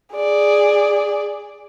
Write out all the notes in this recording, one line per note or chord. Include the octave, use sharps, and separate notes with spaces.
G#4 D5